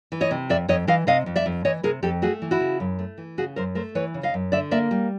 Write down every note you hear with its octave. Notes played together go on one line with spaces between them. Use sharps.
E3
C#5 D#5
C3
F2 D5 E5
F2 C#5 D#5
E3 D#5 F5
C3 D#5 F5
F2
D5 E5
F2
E3 C#5 D#5
C3 G#4 A#4
F2 G4 A4
A3 F#4 G#4
E3
E4 F#4
C#3
F#2
A3
E3
C#3 F#4 G#4
F#2 A#4 C5
A3 A#4 C5
E3 B4 C#5
C#3
D#5 F5
F#2
D3 D5 E5
A#3 D5 E5
G3